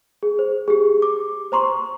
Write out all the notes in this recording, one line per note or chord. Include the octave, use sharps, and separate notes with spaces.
G#4
C5
G4 G#4
D6
C5 A#5 C6 C#6